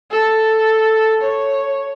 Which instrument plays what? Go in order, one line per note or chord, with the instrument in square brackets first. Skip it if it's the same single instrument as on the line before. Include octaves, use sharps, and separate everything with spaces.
[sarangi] A4
C#5